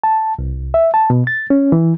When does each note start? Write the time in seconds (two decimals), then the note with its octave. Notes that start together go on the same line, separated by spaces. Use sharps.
0.04 A5
0.39 C2
0.74 E5
0.94 A5
1.10 B2
1.27 A6
1.50 C#4
1.72 E3